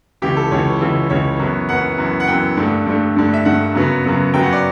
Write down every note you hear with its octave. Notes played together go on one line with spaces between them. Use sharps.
C#2 C#3 E3 G4
A4
C#2 C#3 E3 C#5
C#2 C#3 E3
C#2 C#3 E3 C#5
F#2 E3 B3
F#2 E3 B3 F#5
F#2 E3 B3
F#5
F#2 E3 B3 G5
G2 D3 A3
G2 D3 A3
G2 D3 A3
E5
G2 D3 A3 F#5
F#2 C#3 F#3 B3
F#2 C#3 F#3 B3
F#2 C#3 F#3 B3 G5
F#5
D5